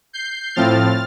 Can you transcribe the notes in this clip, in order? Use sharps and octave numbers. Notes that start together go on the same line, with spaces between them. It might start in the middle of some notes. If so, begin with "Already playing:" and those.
G6 C7
A2 F3 C4 F6 A6